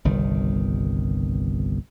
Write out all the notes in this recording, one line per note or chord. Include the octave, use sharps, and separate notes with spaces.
G1 C2 G2 D#3